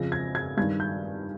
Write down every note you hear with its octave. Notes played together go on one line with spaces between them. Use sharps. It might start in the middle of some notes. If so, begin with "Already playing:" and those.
Already playing: F2 C#3 F3 A#6
G#6
G#6
G2 D#3 G#6
G6